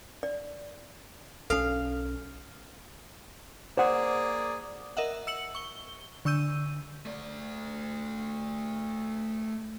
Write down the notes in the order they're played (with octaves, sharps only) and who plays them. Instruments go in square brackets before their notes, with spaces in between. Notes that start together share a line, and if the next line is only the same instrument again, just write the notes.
[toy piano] D5
[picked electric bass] B1 C#4 [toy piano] A4 [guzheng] F5
[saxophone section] A#3 G#4 D5 [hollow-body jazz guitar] C5 F#5
[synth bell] A#4 D#5 E5 F#5
E6 C#7 F#7
C#6 G7
D3 C#6 E6 G6 D#7
[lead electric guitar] A3 D5